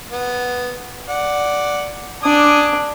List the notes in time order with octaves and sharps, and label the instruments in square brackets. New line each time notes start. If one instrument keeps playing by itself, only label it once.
[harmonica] B3
D5 F#5
[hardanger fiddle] D4 [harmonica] G#5 D6 D#6